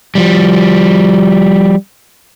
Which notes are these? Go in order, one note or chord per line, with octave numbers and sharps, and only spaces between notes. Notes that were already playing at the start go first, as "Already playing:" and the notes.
F3 G3